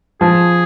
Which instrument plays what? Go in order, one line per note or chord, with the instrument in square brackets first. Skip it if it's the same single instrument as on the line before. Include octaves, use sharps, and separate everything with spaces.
[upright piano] F3 [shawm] G#4